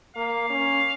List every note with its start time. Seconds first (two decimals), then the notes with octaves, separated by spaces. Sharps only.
0.16 A#3 F5
0.49 C#4